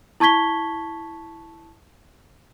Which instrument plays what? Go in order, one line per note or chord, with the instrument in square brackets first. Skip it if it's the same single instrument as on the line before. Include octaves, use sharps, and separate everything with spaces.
[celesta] E4 A5 C#6 G#6 B6 G7